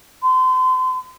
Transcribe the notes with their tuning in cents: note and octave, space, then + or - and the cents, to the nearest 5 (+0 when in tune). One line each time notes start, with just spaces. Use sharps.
C6 -35